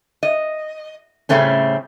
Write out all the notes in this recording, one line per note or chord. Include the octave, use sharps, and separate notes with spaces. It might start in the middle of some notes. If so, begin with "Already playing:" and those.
D#5
A2 C#3 G3 A3 C4 C#4